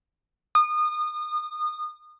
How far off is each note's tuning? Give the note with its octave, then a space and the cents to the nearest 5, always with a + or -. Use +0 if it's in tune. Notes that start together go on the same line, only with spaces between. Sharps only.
D#6 -30